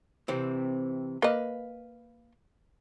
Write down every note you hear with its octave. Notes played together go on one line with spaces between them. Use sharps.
C3 E3 C4
A#3 B4 D#5 F5